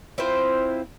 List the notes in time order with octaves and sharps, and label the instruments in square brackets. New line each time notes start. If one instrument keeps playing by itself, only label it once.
[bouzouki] C4 E4 F4 C5